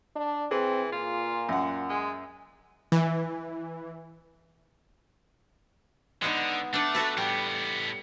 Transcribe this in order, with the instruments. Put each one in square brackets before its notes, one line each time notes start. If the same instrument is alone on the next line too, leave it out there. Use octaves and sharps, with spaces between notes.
[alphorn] D4
[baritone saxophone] E3 [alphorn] C4 [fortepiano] G#4
[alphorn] A#2 [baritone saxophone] F4
[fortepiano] F#2 F#5
[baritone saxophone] G#3
[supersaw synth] E3
[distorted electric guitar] D3 [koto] G#3 B3 D#4
[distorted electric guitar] A3 [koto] D4 D5
[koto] F#4 A4 B4
[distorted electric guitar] A2 B3 [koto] G3